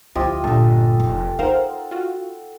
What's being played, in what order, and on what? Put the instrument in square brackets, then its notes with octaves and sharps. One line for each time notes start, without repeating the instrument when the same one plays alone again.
[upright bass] D2 [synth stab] F3 E4 [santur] F4 G4 D#5
[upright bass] G1 A#2 [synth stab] D3 G3 A3 [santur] A4
[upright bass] F1
[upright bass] D#4 [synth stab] A#4 C5 F5 [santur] F#5
[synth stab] F4 F#4